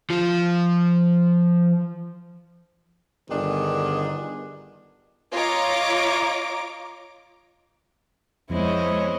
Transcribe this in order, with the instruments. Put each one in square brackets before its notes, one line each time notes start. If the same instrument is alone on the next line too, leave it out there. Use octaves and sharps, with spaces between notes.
[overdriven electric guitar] F3 F4
[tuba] G1 [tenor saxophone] D#3 [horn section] B3 D4 G#4
[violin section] F4 C#5 D#5 A#5 D6
[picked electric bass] F2 [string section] G#3 B3 C4 [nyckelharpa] E4 D#5 [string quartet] C5 C#5